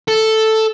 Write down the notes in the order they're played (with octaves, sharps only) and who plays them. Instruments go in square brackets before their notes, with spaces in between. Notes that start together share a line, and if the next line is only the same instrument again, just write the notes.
[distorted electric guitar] A4